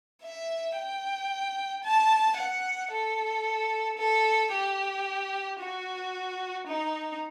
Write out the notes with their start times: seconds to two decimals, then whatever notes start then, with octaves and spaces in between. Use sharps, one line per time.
0.23 E5
0.77 G5
1.84 A5
2.37 F#5
2.91 A4
3.98 A4
4.52 G4
5.60 F#4
6.67 D#4